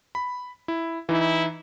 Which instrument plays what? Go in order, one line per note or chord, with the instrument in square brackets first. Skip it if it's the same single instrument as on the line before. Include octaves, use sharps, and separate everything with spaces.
[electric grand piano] B5
E4
[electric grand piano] E3 D#4 [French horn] E4